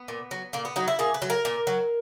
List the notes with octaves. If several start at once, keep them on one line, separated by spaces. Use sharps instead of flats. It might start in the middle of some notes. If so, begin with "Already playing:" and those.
Already playing: B3
A#2
F#3
A#2 A#3
B3
F#3 D#4
E4
A#2 G#4
B4
F#3
A#4
A#2
F#3